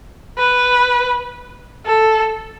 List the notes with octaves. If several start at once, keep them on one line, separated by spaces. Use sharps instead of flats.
B4
A4